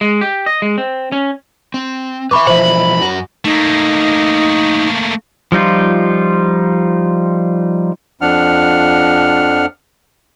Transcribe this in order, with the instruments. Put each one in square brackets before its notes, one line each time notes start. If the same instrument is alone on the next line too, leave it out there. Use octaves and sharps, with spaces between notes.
[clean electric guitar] G#3
G4
D#5
G#3
C4
C#4
[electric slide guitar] C4
[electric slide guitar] B4 E5 [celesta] B5 C#6 D6
[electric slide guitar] B2 E3 F3 [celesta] C5 E5 [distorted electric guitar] B5
[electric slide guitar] F#2 F#4
[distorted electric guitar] A3 A#3 [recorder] D#4
[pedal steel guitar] F3 G3 D#4 F4
[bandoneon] F2 F3 D4 F#5 F6